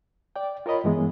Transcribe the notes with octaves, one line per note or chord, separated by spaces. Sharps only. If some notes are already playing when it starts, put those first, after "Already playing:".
D5 G5
F4 A#4 C#5 D#5 B5
G2 E3 G#3 B3